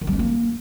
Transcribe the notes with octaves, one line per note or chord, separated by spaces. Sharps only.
D#3
G3
C#4
A#3